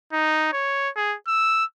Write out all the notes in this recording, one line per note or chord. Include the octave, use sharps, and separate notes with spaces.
D#4
C#5
G#4
E6